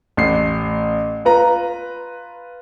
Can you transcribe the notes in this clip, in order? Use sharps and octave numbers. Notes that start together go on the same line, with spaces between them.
A1 C7
F4 B4 A#5